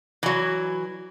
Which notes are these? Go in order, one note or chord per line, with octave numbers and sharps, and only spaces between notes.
E3 F#3